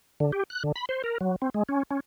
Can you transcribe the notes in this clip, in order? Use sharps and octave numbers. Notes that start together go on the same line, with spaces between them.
D3
G4
F#6
D3
B5
C5
A#4
F#3
C4
G#3
C#4
C#4